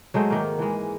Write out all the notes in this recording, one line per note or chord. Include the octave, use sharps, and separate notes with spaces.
F#3 G#3 A3 C5
G#2 D#3 A#3
E3 G#3